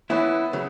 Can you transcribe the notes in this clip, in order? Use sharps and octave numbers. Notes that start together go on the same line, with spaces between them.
E3 B3 C#4 E4
C#3 F#3